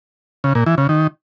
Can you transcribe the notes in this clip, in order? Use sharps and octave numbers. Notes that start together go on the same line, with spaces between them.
C#3
A#2
E3
C#3
D#3